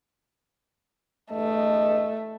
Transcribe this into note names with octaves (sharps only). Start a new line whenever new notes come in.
E2 G2 A3 D#5